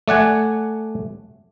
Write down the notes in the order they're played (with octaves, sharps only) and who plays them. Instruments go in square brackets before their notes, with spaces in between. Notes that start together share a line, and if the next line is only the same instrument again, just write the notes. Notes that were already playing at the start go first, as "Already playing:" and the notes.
[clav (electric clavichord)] A3 D5 F#5 G#5